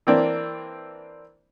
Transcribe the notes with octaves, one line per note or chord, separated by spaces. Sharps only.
E3 A#3 C4 D4